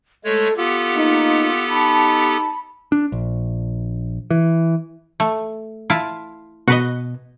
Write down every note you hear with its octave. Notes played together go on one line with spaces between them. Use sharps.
G#3 A3 A4 C#5
B3 F4 G4 A4
A#3 D#4
D#4 A5 B5
D4
A#1
E3
A3
E4 F4 A5
B2 F#4 B4 D#5